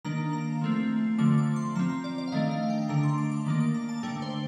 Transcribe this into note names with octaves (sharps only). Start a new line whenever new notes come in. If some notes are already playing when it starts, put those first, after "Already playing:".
D#3 A#3 D4 A#5
A#5
F3 A3 C4
D3 F3 A3 D6
D6
C6
F3 C4 A#5
A#5
D5
D5
F5
D#3 A3 D4 D#5
F5
G5
D3 A3 D4 A#5
C6
D6
D6
D#3 A#3 D4 D6
D6
A#5
A5
D3 A3 D4 G5
C5